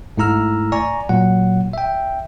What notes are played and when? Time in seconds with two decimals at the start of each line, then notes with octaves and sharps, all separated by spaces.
0.17 G#2 A3 E4 A#5 E6 F6
0.72 D5 G#5 A#5 C#6
1.09 A#2 F#3 F#5
1.73 E5 G5